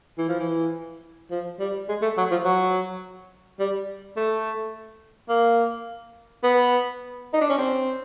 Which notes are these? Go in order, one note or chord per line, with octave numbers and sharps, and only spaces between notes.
E3
F3
E3
F3
G3
G#3
A3
F#3
F3
F#3
G3
A3
A#3
B3
D#4
D4
C#4
C4